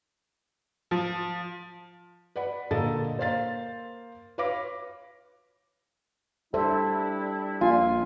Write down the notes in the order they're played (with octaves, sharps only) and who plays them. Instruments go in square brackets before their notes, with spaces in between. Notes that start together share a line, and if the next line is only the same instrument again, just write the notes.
[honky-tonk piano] F3
[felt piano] B4 D5 F#5 B5
A#2 D3 A#3 A4 D#5 A6
A#3 C5 F5 A6
B4 C#5 F5 B5 D6 A#6
[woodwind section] G3 D4 E4 [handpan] A4 C5 E5
[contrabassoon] A#1 [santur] F4 G#5